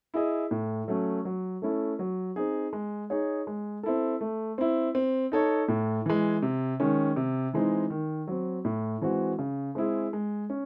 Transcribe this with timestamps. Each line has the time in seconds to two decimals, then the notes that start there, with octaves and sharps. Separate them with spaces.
0.14 E4 G#4 D#5
0.51 A2
0.88 F#3 A3 C#4
1.25 F#3
1.62 A3 C#4 E4 A4
1.99 F#3
2.36 C4 D#4 G#4
2.73 G#3
3.10 D#4 G#4 C#5
3.47 G#3
3.83 C4 E4 A4
4.21 A3
4.58 C4 E4
4.95 C4
5.32 D#4 A4 C#5
5.68 A2
6.06 E3 G#3
6.43 C3
6.80 D#3 G#3 C#4
7.16 C3
7.54 E3 G#3 C4 D#4
7.90 D#3
8.28 F#3 C4
8.65 A2
9.02 E3 G#3 C4 F#4
9.39 C#3
9.75 G#3 C4 E4 G#4
10.13 G#3
10.50 C#4